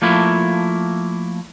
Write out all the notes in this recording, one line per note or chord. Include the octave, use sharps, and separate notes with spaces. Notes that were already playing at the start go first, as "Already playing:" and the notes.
F3 A3 A#3 E4